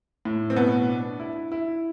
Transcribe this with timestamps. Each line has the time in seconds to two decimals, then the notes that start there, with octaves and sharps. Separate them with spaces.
0.25 A2
0.50 C4
0.56 B2 B3
0.88 D4
1.20 E4
1.52 E4